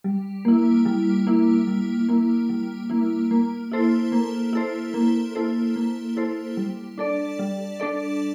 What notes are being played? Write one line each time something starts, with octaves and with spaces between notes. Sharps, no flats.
G3
A#3 E4
G3
A#3 E4
G3
A#3 E4
G3
A#3 E4
A#3
E4 A4 C5
A#3
E4 A4 C5
A#3
E4 A4 C5
A#3
E4 A4 C5
G3
D4 A4 D5
G3
D4 A4 D5